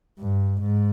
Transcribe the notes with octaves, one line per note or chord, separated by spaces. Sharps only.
G2
G#2